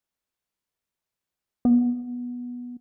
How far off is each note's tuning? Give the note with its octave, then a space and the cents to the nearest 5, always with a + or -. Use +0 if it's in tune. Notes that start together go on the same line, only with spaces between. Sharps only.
B3 -15